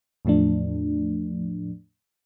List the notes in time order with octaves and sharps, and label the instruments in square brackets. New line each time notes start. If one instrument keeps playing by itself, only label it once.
[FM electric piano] E2 A2 F3 A3 D4